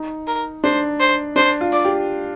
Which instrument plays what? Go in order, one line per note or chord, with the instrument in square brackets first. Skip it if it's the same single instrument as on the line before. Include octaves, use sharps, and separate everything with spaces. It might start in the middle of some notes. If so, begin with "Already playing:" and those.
Already playing: [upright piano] D#4
[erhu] A#4
[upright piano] D4 [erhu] C5
[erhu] C5
[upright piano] D4 [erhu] C5
[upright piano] F4
[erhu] D5
[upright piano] G4